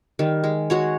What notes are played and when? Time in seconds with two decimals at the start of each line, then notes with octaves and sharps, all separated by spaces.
0.19 D#3 G3
0.44 G#3
0.70 G#3 F#4 C#5